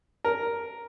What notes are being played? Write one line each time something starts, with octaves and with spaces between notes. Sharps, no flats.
A#4